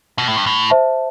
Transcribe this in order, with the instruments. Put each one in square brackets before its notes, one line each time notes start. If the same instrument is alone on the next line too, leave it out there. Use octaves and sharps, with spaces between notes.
[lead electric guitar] B2
A2
G2
A2
[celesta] C5 E5 A5